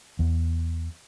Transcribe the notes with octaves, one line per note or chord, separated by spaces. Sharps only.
E2